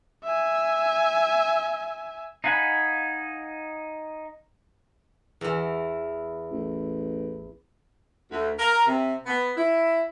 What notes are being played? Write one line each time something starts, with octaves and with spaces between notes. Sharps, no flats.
E5 G#5
D#4 F5 F#5 G#5 B5
E2 E3
A1
D2
A#4
C3
B3
E4